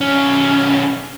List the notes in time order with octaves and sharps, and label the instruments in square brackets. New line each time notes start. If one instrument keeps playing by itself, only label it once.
[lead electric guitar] B1 C#4